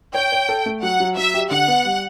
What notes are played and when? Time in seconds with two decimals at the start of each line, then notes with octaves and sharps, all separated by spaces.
0.14 C#5 G5
0.32 C#5
0.49 A4
0.66 A3
0.83 F#3 F#5
1.00 F#3
1.17 F#3 E5
1.34 G4
1.51 D3 F#5
1.68 B3
1.85 G3